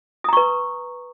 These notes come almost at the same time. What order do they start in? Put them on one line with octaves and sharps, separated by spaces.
D#6 A#5 C#6 B4